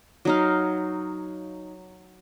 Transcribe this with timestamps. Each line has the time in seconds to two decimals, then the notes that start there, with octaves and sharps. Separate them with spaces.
0.25 F#3 D#4 F5